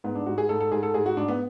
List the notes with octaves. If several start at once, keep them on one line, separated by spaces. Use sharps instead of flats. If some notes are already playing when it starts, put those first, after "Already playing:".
G#2 B3
D4
G#2 F#4
G#4
G#2 A4
A4
G#2 G#4
A4
G#2 G#4
F#4
G#2 D4
B3